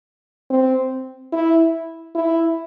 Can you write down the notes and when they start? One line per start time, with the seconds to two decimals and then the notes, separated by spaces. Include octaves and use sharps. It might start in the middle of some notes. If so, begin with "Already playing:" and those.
0.50 C4
1.32 E4
2.15 E4